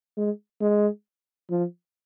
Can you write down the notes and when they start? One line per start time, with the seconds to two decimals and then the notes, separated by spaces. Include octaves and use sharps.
0.17 G#3
0.61 G#3
1.50 F3